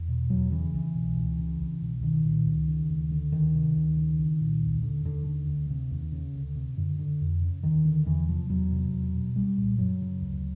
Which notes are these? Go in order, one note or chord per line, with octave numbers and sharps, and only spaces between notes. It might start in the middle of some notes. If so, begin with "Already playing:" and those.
Already playing: E2
B2
E2 F#3
C#3 E3
C2 E3
B2
C#2
C#3
C2
B2
C2 D#3
A#2
C#2
C#3
D2
D3
D2 D#3
C3
D2
C#3
C2
A#2
D#2
D3
D#2 D3
D3
D2
C3
D#2
C#3
D2
C3
F#2 D3
D3
F2
C#3
D#2 D#3
D3
E2 E3
C3 F3
E2 F#3
C3
E2
B2
C2 G3
A#2
F#2 F#3
C#3
D2